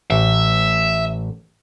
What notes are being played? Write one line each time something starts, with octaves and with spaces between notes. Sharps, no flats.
A1 E5